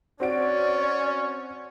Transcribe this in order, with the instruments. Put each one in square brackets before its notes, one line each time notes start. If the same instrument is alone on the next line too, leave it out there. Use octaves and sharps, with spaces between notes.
[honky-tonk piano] C4 F#4 D7 [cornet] C#4 [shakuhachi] D5